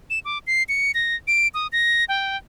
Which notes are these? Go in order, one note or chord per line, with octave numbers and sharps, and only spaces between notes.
E7
D6
C7
C#7
A#6
D7
D#6
A#6
G5